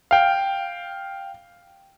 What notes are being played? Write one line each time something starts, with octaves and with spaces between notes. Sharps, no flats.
F5 G5